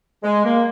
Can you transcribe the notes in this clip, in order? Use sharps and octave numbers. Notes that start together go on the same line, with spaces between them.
G#3
A#3